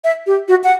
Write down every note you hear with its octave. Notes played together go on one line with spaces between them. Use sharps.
E5
G4
F#4
F#5